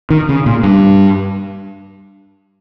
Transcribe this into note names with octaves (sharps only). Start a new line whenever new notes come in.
D#3
C#3
A#2
G2